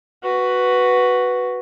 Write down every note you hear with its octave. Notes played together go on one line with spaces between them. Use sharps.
F#4 B4